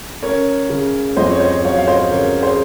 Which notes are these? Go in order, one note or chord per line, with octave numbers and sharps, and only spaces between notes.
C#4 A#4 C#5
C#3
F2 C5 D#5
C#5
C5 D#5
F#3 C#5 F5
F5
C5 D#5
C#3 A#4 C#5
G#4 C5